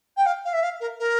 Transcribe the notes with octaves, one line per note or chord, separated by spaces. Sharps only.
G5
F5
F5
E5
F5
A#4
A#4